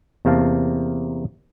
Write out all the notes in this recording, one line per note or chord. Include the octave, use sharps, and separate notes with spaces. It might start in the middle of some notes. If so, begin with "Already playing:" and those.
E2 C3 A#3 F5 A5